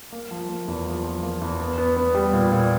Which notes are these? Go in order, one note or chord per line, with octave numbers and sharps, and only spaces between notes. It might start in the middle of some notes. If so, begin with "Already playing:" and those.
A#3
F3
A#3
E2
F3
F3
A#3
E2
B3
B3
B3
G3
A#2
A#2